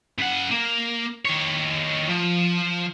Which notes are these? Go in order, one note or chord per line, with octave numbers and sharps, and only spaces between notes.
C#3 F#5
A#3
D#3 C#5
F3